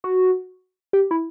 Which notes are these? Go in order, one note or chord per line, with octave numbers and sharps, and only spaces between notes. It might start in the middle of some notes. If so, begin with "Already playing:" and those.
F#4
G4
E4